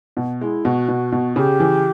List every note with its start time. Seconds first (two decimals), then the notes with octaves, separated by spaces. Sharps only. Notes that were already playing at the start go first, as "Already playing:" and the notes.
0.17 B2
0.41 G#3 E4
0.65 B2 F#4
0.88 B2
1.12 B2
1.36 C#3 G4
1.60 E3